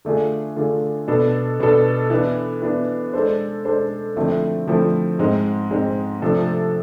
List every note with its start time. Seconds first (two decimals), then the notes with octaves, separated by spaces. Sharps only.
0.05 D3 A3 D4 F4 G#4
0.56 D3 A3 D4 F4 G#4
1.08 B2 B3 D4 A4
1.60 B2 B3 D4 A4
2.10 E3 B3 D4
2.62 E3 B3 D4
3.13 G#3 D4 A4 C5
3.65 G#3 D4 A4 C5
4.16 D3 F3 A3 C4 E4
4.67 D3 F3 A3 C4 E4
5.19 G#2 G#3 C4
5.71 G#2 G#3 C4
6.21 C3 F3 A3 D4 A4